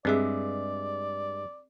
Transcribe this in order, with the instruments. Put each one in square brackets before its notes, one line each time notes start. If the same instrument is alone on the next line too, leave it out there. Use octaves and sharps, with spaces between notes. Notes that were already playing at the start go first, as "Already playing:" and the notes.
[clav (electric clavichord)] G2 G#3 E5 [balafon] C4 G#4 [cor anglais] D5